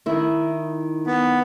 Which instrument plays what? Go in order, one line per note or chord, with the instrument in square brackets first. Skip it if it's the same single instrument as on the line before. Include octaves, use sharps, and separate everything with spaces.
[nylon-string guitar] D#3 E4
[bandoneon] B3